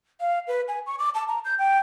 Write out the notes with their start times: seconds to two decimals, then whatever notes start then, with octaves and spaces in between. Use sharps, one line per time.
0.20 F5
0.48 B4
0.68 G#5
0.86 C#6
0.99 D6
1.15 A5
1.28 A#5
1.45 G6
1.59 G5